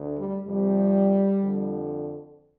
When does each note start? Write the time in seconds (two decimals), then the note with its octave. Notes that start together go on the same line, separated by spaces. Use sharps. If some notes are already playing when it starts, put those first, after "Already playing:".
Already playing: D2 D3
0.15 G3
0.46 F2 C3 G3
1.41 F2 D3